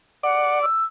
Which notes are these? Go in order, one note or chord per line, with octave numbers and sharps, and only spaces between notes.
D5 F#5
E6